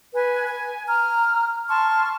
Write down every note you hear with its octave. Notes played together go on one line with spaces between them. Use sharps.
B4 G#5
G#5
A#5 F6
A5 C6 C#6 F6